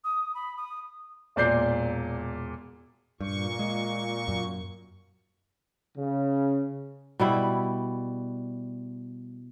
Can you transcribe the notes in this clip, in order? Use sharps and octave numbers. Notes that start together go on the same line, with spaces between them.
D#6
B5
D#6
E1 A#2 D5 G6 C7
G2 A#2 C#6
G#3
F#2
C#3
B2 G3 E4